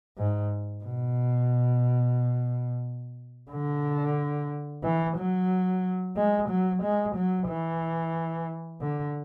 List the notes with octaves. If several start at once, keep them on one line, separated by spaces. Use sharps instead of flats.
G#2
B2
D3
E3
F#3
G#3
F#3
G#3
F#3
E3
D3